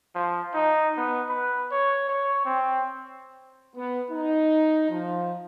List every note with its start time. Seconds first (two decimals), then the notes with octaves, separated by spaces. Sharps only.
0.15 F3
0.54 D#4
0.97 B3
1.29 B4
1.72 C#5
2.09 C#5
2.45 C4
3.76 B3
4.11 D#4
4.90 F3